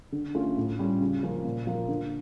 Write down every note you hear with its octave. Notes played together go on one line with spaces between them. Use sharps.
D3
A3 C#4 F4
A2
G3 C#4 F4
C#3
F3 A#3 C#4
A#2
F3 A#3
D3